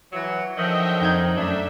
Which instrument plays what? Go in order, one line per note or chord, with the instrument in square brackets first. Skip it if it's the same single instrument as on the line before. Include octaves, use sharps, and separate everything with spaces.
[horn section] E3 F#3
[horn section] D3 D#3 F#3 [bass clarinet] F3 [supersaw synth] D#5 E5 G5
[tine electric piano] F2 G6 G#6 [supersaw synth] D#4
[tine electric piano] F#2 [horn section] A3 D4 [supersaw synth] E5